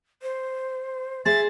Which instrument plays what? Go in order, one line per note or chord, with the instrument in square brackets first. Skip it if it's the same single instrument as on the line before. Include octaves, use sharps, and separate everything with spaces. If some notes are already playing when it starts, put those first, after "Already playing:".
[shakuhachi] C5
[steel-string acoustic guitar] G#4 C5 [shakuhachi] E5 [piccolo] A6